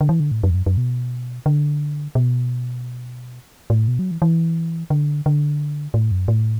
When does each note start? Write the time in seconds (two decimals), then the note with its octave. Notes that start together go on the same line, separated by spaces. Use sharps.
0.01 D3
0.09 E3
0.20 D3
0.31 A2
0.43 F#2
0.50 E2
0.54 F#2
0.66 F#2
0.77 B2
1.46 D3
2.15 B2
3.70 A2
3.88 B2
3.99 F#3
4.11 E3
4.22 E3
4.90 D3
5.26 D3
5.94 A2
6.11 F#2
6.28 A2